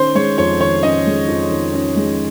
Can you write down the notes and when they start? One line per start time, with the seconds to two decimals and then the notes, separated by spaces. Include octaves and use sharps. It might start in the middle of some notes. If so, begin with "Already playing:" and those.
Already playing: D#3 C#4 C5
0.15 G#3 C#5
0.38 F2 C#5
0.60 D#3 C#5
0.83 C#4 D#5
1.07 G#3
1.28 F2
1.51 D#3
1.73 C#4
1.96 G#3